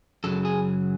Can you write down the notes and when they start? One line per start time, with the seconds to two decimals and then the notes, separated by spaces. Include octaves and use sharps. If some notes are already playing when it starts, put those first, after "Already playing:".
0.24 F#2 C#3 F#3 A4
0.45 G#4